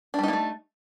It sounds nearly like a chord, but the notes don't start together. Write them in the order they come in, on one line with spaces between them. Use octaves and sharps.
D4 G3 D#4 A#3 A3